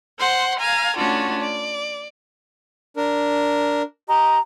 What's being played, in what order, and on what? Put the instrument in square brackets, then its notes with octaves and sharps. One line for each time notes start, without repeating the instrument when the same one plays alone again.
[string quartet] C5 F#5 C6
F5 G#5 A#5
A3 C#4 D4 F4 F#4
D5
[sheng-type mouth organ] D4 A#4
[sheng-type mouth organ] G4 D#5 [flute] A#5